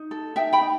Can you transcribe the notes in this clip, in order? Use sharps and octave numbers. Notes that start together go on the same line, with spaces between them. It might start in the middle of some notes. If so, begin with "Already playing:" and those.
Already playing: D#4
A4
D#4 E5 G5
G5 B5
D#4